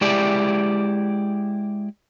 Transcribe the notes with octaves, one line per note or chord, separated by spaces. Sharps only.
G#3 E4 G4 D5